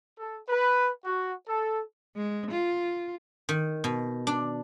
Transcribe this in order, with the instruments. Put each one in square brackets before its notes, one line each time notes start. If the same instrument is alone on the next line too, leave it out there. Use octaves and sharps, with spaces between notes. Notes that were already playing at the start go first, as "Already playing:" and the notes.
[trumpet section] A4
B4
F#4
A4
[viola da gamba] G#3
F4
[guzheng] D#3
B2
D4